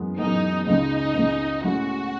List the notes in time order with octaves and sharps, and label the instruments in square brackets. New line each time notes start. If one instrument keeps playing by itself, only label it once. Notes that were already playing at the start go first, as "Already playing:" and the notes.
Already playing: [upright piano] F#2 E3 G#3 B3
[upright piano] F#2 E3 G#3 B3 [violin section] D#4
[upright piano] C#2 C#3 G#3 [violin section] D#4
[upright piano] C#2 C#3 G#3
[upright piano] A2 G#3 C#4 E4 [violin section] F#4